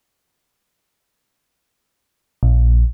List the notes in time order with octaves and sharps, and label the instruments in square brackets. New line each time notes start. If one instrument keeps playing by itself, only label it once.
[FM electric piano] A#1